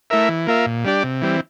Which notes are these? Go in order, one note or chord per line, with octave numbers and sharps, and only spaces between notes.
A3 E4 A#4 E5
E3
A#3 F4 A#4 E5
A#2
G3 D4 G4 D5
C3
E3 G3 C4